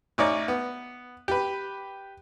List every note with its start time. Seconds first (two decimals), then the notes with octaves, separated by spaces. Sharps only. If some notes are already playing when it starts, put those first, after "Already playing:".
0.18 A1 D#4 C#5 D5
0.48 B3
1.28 G4 B4